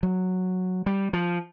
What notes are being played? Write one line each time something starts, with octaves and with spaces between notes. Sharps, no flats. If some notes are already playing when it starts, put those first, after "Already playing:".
F#3
G3
F3